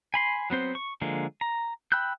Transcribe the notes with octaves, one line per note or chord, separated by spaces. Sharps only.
G#5 B5 C6
F#3 B3 C4 C5
C#6
D3 F3 G#3 A#3
A#5
G5 B5 E6 F#6 G6